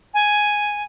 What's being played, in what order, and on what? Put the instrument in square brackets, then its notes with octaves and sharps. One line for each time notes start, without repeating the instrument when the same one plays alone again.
[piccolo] G#5